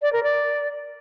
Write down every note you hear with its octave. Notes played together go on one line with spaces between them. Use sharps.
D5
A#4
D5